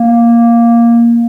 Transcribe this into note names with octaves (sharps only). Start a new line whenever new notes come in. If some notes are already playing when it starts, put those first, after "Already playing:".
Already playing: A#3